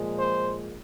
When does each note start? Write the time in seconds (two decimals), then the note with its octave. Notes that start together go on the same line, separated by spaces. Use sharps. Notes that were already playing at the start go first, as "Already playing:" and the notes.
Already playing: A#2 F3 G#3
0.18 C5